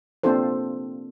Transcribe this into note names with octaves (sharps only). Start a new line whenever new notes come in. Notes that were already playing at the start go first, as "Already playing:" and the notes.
A#3 C4 D4 F4 A4 C5